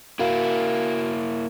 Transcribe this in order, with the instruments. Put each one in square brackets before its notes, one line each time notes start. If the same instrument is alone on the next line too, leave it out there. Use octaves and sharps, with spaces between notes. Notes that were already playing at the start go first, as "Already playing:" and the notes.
[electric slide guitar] A#3 E4 [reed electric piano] F#4 A#4 F5